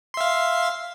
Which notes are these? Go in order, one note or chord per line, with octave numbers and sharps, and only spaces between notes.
E5 F5 C6